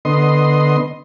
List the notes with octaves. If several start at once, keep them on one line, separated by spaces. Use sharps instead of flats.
D3 B3 D#5 C6